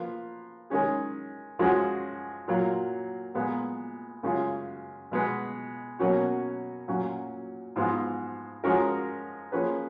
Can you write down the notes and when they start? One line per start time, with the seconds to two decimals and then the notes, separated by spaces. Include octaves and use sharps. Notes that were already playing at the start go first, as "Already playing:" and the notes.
Already playing: F3 A#3 F4 B4
0.70 D#3 G#3 C#4 G#4
1.59 F#2 F3 G#3 C#4 F#4
2.47 A#2 F#3 A#3 F4
3.35 A#2 G#3 B3
4.23 F#2 C#3 G#3 C#4 F4
5.12 B2 G#3 B3
5.99 B2 F#3 A#3 C#4 F#4
6.88 A#2 F#3 C#4 F#4
7.76 G#2 F3 G#3 B3 F4
8.64 F3 G#3 C#4 F#4 A#4
9.52 F3 A#3 C#4 G#4 B4